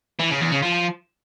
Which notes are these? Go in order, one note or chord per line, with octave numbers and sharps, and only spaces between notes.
E3
C#3
E2
C#3
F3